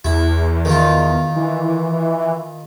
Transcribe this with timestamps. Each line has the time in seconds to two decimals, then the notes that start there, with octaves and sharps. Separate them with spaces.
0.05 E2 E4
0.65 D#3 F4
1.36 E3